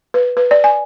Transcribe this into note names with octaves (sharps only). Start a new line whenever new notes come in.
B4
B4
D5
G#5